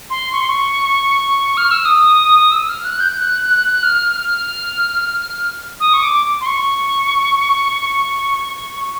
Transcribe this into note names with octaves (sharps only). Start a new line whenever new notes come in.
C6
C#6
C6
C#6
F6
E6
D#6
E6
E6
F6
F#6
G6
G6
F#6
F#6
F6
F6
D#6
C#6
D6
C6
C#6